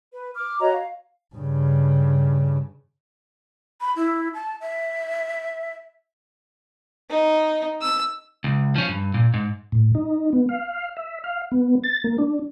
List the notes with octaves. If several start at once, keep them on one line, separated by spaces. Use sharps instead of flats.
B4
D6 F6
F#4 C#5 D#5 A#5
F5
G2 C#3
B5
E4
A5
E5
D#4
E6
C#2
F3 C#4
G2
A#2
G#2
A2
D#4
B3
F5
E5
F5
B3
A6
A#3
D4